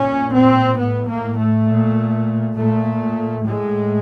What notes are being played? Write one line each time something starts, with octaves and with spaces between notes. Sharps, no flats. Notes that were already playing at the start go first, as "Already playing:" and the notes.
Already playing: A#2 C#4
C4
A2 B3
A#3
A3
A#2
A#2 A3
A2 G#3